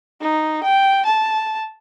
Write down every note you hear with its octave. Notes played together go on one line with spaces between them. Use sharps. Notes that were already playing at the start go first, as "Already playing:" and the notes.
D#4
G5
A5